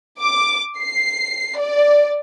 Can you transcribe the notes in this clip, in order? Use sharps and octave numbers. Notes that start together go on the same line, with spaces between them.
D6
C7
D5